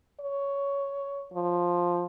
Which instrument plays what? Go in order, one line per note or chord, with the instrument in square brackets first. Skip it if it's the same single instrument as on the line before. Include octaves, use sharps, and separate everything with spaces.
[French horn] C#5
F3